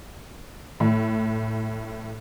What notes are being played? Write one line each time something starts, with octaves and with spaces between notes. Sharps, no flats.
A2